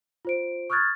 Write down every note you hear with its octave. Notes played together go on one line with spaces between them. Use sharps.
F4 C5 D7
C#6 D#6 F6 F#6 G#6 A6